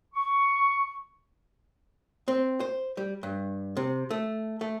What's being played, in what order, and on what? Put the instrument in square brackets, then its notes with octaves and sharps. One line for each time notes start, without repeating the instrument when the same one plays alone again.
[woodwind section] C#6
[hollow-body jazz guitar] C4
C5
G3
G2
C3
A3
A3